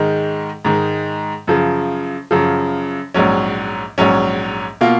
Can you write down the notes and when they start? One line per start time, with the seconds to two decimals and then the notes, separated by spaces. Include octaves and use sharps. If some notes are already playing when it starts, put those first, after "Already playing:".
Already playing: G#2 D#3 G#3
0.65 G#2 D#3 G#3
1.47 F#2 C#3 F3
2.31 F#2 C#3 F3
3.14 A#1 G#2 F#3 C#4
3.98 A#1 G#2 F#3 C#4
4.81 B2 A#3 F4